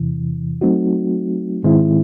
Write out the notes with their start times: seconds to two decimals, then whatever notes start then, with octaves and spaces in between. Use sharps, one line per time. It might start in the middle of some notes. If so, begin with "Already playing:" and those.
Already playing: E2 C3 E3
0.61 F#3 A3 C4 D#4 F#4
1.63 G#2 D#3 G#3 C4 E4